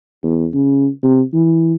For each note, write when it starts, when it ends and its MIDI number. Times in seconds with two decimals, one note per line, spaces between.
0.23 0.48 40
0.54 0.88 49
1.03 1.21 48
1.34 1.75 52